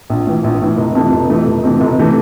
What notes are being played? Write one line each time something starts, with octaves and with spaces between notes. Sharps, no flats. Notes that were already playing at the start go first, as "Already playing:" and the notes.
A#1
A2 E3
A#1
A2 E3
F1
F2 C3 E3 A3
F1
F2 C3 E3 A3
F1
F2 C3 E3 A3
F1
C3 E3 A3